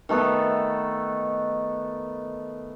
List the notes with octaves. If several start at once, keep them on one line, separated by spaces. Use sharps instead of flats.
D#3 A3 B3 A4